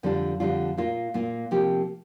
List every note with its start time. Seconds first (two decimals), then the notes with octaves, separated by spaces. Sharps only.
0.03 F2 D3 G3 D4 F4
0.40 F2 D3 G3 D4 F4
0.78 A#2 A#3 F4
1.14 A#2 A#3 F4
1.51 C3 F3 A#3 G4